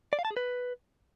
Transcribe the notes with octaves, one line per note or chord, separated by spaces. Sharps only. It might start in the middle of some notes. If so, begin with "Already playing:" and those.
D5
F5
A5
G#4
B4